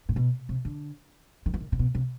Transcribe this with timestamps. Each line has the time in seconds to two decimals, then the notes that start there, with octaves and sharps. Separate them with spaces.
0.09 A#2
0.16 B2
0.49 C3
0.65 D3
1.46 D#3
1.54 E3
1.60 D#3
1.72 C3
1.79 B2
1.95 C3